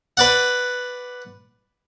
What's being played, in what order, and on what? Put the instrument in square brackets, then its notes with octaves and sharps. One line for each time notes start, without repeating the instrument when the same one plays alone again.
[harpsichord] B4 D5 F#5